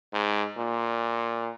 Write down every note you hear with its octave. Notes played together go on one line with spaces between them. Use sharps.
G#2
A#2